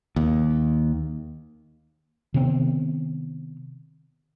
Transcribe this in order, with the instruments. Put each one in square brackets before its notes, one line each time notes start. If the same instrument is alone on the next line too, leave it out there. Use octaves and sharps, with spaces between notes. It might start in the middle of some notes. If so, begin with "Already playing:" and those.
[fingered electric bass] D#2
[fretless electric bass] C3 D#3 B3 C4